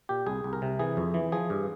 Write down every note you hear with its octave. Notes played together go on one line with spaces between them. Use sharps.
A#2 G4
C2 G#4
C2
A#4
C3
E3 G#4
F2
E3
F3 G#4
G2